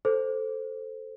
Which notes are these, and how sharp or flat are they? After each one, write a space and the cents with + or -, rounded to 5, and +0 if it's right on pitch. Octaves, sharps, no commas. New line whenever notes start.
A4 +0 C5 +0